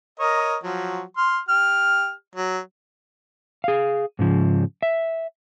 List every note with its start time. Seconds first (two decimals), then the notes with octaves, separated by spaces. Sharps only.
0.20 A#4 C#5 D#5
0.63 F3 F#3 F#4
1.17 C6 F6
1.49 G4 F6
2.36 F#3
3.64 G#4 F5
4.19 G#2 C#3 F3
4.82 E5